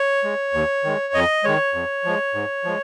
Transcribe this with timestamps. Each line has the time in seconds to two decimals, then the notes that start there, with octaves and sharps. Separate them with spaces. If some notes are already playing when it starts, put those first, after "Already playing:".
Already playing: C#5
0.24 G#3
0.54 D#2
0.84 D#3 G#3
1.14 F2 D#5
1.44 D#3 G#3 C#5
1.74 F2
2.05 F3 G#3
2.35 G#2
2.64 F3 G#3